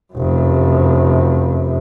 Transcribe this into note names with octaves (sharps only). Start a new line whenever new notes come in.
F1 F#2